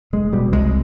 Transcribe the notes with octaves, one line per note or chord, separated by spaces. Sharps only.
F1 G#3
B2 G3
C2 G#3